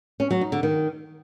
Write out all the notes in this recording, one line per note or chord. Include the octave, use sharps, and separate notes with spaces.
C#4
F#3
D#4
D3
D#3